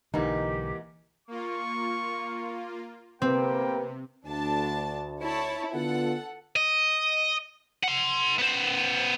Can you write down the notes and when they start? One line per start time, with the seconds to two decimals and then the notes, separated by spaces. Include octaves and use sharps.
0.14 B1 G#2 D3 E3 A#3 D#4 G4
1.28 A#3 F4 C#6
3.22 C3 A#3 C4 G4 B4 G5
4.26 D2 D4 A5
5.22 E4 C#5 A5
5.73 D3 B3 F4 A4 F#5
6.56 D#5
7.84 F#5 C6
8.38 B3 C5